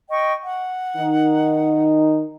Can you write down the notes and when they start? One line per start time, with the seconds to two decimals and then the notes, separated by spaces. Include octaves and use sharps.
0.10 D#5 G5 C#6
0.43 F#5
0.96 D#3 D#4